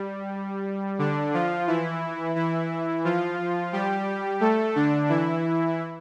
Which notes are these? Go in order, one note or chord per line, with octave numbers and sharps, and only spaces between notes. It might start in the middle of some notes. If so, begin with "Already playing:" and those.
Already playing: G3
D3 D4
F3 F4
E3 E4
E3 E4
F3 F4
G3 G4
A3 A4
D3 D4
E3 E4